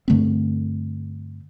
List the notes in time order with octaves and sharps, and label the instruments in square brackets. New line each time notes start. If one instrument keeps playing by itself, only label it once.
[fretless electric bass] G2 D3 A3 C4